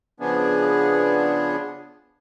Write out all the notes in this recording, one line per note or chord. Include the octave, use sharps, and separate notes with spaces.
C#3 F3 B3 D4 G#4